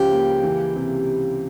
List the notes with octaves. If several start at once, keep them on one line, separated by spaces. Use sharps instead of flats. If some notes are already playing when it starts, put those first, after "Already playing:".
Already playing: C#2 C#3 F3 G4
A#3
E3
C3